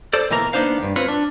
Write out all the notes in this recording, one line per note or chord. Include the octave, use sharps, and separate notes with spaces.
A4 C5 D5
B2 E3 A#3 A#4 A#5
A#3 B3 D4 D#4 C5 F5
E2 G2
C4 F4 B4 C#5
D4